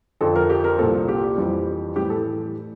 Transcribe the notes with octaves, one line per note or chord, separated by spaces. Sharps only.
F2 D3 F3 A4
A#4
G4
A#4
C2 A#2 F3 A4
G4
F2 E3 G3
A2 E3 G3 G4
A4